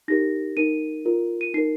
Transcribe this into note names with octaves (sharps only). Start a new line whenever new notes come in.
D#4 G4 A#4 A#6
D#4 A#4 D#7
F4 A#4
D#7
D#4 A#4 C7